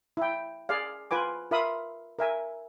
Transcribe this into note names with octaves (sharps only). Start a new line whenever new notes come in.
E4 G5
G#4 D5 F5
F4 B4 G#5 D6
F4 A#4 E5 F5 B5 D#6
A#4 E5 G#5